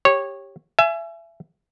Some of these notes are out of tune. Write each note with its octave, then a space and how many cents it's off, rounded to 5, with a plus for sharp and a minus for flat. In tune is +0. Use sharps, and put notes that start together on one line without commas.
G4 +5 C#5 -15
E5 +30 G#5 +20